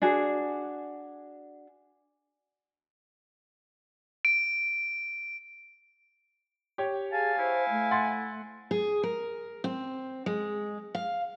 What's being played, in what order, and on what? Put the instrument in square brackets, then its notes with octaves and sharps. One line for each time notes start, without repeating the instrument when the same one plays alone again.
[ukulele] D4 F#4 G#4
[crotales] D7
[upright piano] G4 C#5
[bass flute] G#4 [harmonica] F5 G#5 [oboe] A5
[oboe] E4 [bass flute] C5
[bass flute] A3
[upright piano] F#5 C6 A6
[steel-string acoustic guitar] G#4
A#4
C4
G#3
F5